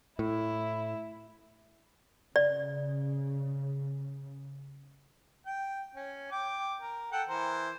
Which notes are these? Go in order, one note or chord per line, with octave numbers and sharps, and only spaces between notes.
A2 E4
C#3 D5
G5
C#4
G5 D6
A#4
A4 F#5 G5
E3 A#4 C5